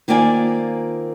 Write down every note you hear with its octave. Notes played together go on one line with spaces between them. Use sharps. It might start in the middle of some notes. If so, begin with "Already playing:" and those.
D#3 A#3 C4 F4 D5 G#5